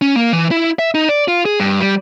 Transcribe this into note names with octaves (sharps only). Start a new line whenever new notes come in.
C#4
A#3
E3
E4
E5
D#4
D5
F4
G#4
G2
G3